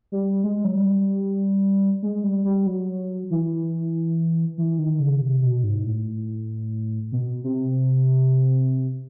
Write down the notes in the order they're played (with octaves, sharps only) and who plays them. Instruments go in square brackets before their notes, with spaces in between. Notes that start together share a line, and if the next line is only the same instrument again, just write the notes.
[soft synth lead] G3
G#3
F#3
G3
G#3
G3
G3
F#3
E3
E3
D#3
C#3
C3
B2
G#2
A2
B2
C3